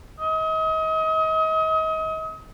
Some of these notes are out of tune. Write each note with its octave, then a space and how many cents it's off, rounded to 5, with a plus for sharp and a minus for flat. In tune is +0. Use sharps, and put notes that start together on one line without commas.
D#5 +35